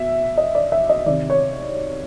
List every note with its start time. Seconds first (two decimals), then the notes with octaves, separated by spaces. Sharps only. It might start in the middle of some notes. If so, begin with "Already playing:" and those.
Already playing: B2 E5
0.38 D#5
0.55 D5
0.72 E5
0.89 D#5
1.06 C3 D#3 D5
1.30 C#5